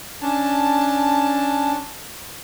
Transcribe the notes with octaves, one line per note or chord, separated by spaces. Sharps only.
C#4 D4 A5